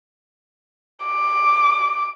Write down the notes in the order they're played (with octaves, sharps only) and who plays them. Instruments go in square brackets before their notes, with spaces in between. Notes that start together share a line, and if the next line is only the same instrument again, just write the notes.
[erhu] D6